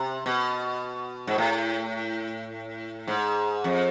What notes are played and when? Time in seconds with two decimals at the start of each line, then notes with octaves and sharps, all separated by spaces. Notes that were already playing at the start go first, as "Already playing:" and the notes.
Already playing: C3
0.26 B2
1.27 G#2
1.38 A2
3.07 G#2
3.64 F2